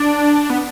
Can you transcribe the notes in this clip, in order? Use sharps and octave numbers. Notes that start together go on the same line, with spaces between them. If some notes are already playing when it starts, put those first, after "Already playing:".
Already playing: D4
B3